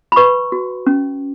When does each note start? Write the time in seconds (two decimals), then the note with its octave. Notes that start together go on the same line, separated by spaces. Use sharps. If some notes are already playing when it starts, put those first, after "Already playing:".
0.12 B5
0.16 B4 C#6
0.52 F#4
0.87 C#4